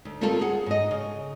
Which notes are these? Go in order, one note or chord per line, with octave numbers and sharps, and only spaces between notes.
D2
G3 A3 A#3 C4 F4 A4
G#4 F#5
G#2 D#5
C#3